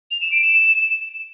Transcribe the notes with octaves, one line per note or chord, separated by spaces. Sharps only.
F7
E7
D7
E7